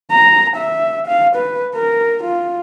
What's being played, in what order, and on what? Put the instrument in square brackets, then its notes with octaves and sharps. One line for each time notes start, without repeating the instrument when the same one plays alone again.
[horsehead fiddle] A#5
E5
F5
B4
A#4
F4